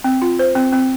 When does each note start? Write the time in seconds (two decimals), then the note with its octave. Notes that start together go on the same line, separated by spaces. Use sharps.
0.04 C4
0.22 F4
0.39 C5
0.55 C4
0.73 C4